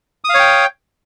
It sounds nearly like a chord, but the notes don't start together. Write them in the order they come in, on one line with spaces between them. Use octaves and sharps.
D#6 F5 C#5 G5